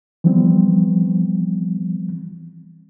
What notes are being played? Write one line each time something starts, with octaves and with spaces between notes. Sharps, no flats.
E3 F3 G3 B3 C4